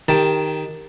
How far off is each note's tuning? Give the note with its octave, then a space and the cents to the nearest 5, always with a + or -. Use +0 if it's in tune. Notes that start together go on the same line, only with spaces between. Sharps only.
D#3 +0 G4 +10 A5 +0